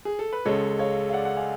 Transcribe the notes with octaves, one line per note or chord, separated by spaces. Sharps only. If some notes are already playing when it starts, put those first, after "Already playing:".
G#4
A4
B4
C#2 C#3 G#3 A4 C#5
C#5 F5
F5
D5 F#5
F#5
F5 G#5